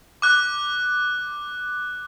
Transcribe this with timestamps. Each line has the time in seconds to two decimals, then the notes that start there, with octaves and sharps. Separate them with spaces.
0.22 D6 F#6